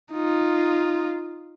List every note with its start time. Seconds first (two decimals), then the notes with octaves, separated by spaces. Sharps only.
0.13 D#4 F4